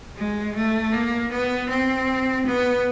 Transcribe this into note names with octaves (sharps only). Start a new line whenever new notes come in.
G#3
A3
A#3
B3
C4
B3